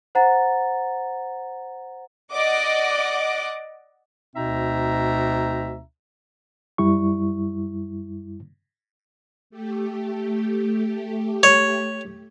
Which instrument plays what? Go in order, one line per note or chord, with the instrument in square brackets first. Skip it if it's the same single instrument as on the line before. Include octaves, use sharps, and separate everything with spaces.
[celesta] C5 F#5 A#5 A6
[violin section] D5 D#5 F#5 D6
[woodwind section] D2 B2 C4 D#4 E5 A#5
[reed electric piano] F#2 G3 E4 C#6
[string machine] A3 G4
[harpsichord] C#5